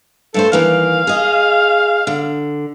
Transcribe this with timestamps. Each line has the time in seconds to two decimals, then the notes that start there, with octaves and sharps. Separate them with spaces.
0.34 G2 A3 A4 C5
0.52 D#2 E3 A#3 F5
1.07 G#4 D#5
2.07 D3